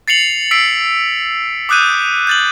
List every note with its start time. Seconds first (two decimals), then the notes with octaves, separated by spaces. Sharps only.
0.08 A6 C7 C#7 F7 F#7
0.51 E6 B6 C7 D7
1.69 D6 D#6 F#6 G6 D#7
2.27 G6 A6 F#7